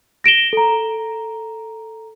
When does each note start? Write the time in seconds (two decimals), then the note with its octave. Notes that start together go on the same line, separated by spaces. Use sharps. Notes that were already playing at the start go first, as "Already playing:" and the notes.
0.24 A#6 D7 E7 G7
0.53 A4 A#5